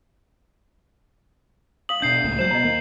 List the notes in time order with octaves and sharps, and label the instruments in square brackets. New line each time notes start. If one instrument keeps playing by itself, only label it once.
[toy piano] F5 D#6 [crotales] F#7
[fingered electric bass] B2 D4 [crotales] G6 C7
[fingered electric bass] C#2 A2 A#3
[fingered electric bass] F#3 G#3 [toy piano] C5 [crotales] G6 E7
[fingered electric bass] B2 B3 [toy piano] D#5 A#5
[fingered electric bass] D#2 A#3